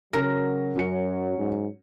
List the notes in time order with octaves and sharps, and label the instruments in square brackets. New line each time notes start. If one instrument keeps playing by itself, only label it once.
[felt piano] C#3 A#6 [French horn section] F#3 [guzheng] A#4
[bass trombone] F#2 [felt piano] C#4 F#4 C#7
[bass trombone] G#2